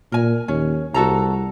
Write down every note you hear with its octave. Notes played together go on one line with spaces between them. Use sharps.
A#2 A#4 G#5
D#2 C#4
C2 F#4 A4 A#5